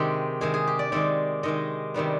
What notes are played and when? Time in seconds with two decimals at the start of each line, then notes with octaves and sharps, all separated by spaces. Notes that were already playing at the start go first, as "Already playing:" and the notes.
Already playing: C3 D#3 G#3 G4
0.41 C3 D#3 G#3 G#4
0.54 G#4
0.67 G4
0.79 D5
0.92 C3 D#3 G#3 D5
1.43 C3 D#3 G#3 D#5
1.94 C3 D#3 G3 B3